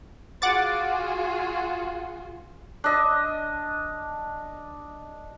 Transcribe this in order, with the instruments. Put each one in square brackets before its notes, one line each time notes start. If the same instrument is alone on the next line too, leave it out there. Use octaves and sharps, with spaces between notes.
[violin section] F4 F#4 G#4 [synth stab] F#5 D6 A6
[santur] D4 D#5